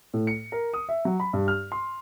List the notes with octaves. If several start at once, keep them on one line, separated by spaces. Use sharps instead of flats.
A2
C#7
A#4
D#6
E5
F#3
B5
G2
F6
C6